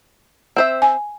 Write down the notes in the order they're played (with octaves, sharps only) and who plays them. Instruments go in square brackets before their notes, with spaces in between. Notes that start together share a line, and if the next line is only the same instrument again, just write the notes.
[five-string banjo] C4 C5 E5
[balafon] G#5